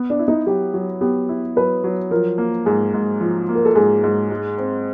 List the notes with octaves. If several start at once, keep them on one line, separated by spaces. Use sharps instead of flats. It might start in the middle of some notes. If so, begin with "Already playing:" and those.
Already playing: B3
D4
E4
D#4
F#3 G4
F#3
B3 G4
E4
F#3 B4
F#3
F3 A#4
A#3
G#2 G#4
G#2
F3
A#3
A#4
A4
G#2 G#4
G#2
G#3
C4